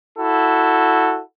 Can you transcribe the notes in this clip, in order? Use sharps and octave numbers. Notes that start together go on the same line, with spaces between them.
E4 F#4 A4